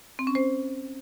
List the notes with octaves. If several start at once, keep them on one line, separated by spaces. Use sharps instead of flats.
C4
C#4
C5